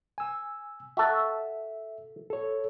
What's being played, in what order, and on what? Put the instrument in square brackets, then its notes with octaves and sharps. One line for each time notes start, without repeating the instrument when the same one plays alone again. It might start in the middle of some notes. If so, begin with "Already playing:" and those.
[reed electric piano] G#5 E6
[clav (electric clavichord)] F#4 A4 [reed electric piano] E5
[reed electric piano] A4 C#5